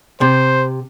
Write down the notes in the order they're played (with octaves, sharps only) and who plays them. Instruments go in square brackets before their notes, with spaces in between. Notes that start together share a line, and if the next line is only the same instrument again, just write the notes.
[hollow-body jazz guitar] C3 [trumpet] C5